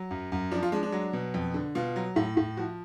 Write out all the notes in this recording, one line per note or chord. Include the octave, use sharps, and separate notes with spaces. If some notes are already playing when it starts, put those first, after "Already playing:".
Already playing: F#3
F#2
F#2
F3 D4
F4
G#3 D4
D4
F#3
B2
F2
D3
B2 F4
F#3
A2
A2
F3 F#4